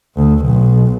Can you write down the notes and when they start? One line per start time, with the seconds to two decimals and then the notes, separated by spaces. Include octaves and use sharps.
0.16 D2
0.46 B1